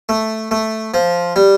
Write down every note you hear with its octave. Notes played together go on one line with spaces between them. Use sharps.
A3
A3
F3
G3